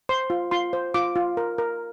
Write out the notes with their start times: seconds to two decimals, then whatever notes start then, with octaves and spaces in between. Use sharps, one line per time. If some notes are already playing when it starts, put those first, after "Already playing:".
0.09 C5 C6
0.30 F4
0.51 F4 C6
0.73 C5
0.94 F4 D6
1.16 F4
1.37 A#4
1.58 A#4